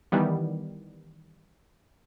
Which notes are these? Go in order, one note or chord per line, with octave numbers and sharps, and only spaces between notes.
D#3 E3 G3 B3